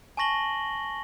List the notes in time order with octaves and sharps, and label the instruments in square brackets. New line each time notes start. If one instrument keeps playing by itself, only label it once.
[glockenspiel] G#5 A5 C#6 A#6 F#7 G7